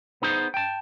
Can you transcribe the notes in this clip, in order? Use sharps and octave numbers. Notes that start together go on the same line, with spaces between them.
B3 D#4 G#4 C5
G5 A5